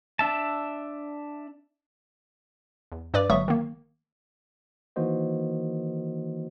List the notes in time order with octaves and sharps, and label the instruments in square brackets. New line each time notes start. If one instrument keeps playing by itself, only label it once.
[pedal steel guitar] D4 E5 A5
[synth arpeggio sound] E2
G2 B4 D5 D6
G1 F#3 G#3 E5 C#6 D#6
D#3 A#3
[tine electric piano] D#3 E3 A#3 F#4 C5 D#5